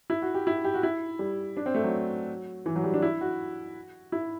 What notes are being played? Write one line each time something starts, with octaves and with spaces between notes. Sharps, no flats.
E4
F#4
G4
E4
G4
F#4
E4
G3
D4
C4
A3
F#3
E3
F#3
G3
D4
E4
F#4
E4